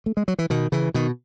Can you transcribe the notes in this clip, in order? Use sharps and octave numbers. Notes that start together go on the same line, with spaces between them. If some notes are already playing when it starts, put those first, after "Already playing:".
A3
G#3
F#3
E3
B2 D#3
C#3 E3
B2 D#3